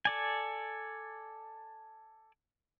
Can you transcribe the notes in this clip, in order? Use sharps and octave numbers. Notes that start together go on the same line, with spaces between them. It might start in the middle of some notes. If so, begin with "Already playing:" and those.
A4 D5 G#5